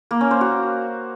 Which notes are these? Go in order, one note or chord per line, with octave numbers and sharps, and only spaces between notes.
A#3
C#4
C5
F#4